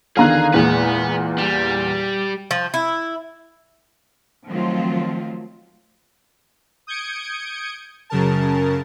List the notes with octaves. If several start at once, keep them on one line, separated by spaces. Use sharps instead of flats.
E2 D3 D#3 G#4 F5 A#5 F#6
E2 A#2 G#3 B4 F#5
G3 E7
F3
E4
D#3 F3 F#3 A3 C4 F4
D#6 G6 G#6 C#7 D7
F#2 C#3 A#4 A5